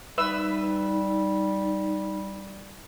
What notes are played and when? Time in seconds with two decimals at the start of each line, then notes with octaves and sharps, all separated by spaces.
0.18 G3 D#4 B4 E5 E6